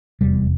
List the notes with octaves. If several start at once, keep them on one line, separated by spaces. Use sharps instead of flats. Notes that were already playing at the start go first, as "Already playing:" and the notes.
F1 E2 C3 G3